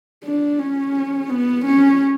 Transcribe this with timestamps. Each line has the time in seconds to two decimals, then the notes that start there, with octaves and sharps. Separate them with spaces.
0.24 D4
0.59 C#4
1.30 B3
1.65 C#4